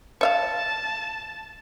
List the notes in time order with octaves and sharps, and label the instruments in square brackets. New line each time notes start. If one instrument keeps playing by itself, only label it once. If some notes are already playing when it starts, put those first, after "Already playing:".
[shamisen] C#5 E5 F5 [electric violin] A5